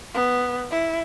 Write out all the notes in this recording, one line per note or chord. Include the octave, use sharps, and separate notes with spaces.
B3
E4